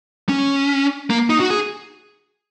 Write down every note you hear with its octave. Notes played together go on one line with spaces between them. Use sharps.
C#4
A#3
D#4
F#4
G#4